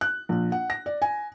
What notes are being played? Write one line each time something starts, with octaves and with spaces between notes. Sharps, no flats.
F#6
A#1
F#5
A#6
D5
G#5